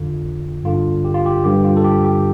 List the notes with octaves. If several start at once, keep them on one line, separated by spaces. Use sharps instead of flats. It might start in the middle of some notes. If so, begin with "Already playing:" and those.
Already playing: F2 D3 F4
G2 D3 F4
G4
F4
G4
G2 D3 G4
F4
A4
G4
G4